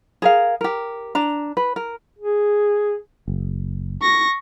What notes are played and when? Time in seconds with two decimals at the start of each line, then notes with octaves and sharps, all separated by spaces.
0.22 G#4 A#4 F5
0.61 G4 A#4
1.15 D4 A#5
1.57 B4
1.76 A#4
2.19 G#4
3.28 F#1
4.02 C#6 A#6